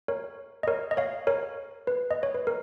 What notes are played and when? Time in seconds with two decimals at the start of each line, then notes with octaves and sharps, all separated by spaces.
0.08 A#4 C#5
0.63 D#5
0.67 A#4 C#5
0.91 D#5
0.97 C#5 F5
1.27 A#4 C#5
1.87 B4
2.11 D#5
2.23 C#5
2.35 B4
2.47 A#4